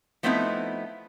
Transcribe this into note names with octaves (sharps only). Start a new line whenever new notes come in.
F3 A3 B3 C4 D#4 E4